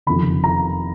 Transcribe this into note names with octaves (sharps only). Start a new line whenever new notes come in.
F#1 F2 C3 D#3 B5
A#5